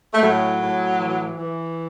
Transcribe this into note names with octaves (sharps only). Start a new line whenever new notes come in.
A3
A2 F#3
A2
E3
E3